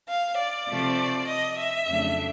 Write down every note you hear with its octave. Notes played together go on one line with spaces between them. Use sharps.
F5
D5
C3 F3 A3
D#5
E5
F2 C#3 F#3 A3 D4